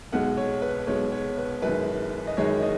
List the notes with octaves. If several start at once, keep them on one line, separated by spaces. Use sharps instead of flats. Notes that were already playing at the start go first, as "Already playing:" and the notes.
B1 B2 G#3 F#5
C#5
B4
B1 B2 G#3 C#5
C#5
B4
F#1 F#2 D#3 G#3 B4
D#5
F#1 F#2 D#3 G#3 C#5
D#5